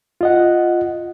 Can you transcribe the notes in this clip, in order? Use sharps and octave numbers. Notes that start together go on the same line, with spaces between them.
F4 D#5 F#5